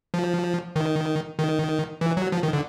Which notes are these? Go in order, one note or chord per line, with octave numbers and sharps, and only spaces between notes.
F3
D#3
D#3
E3
F#3
F3
D#3
D3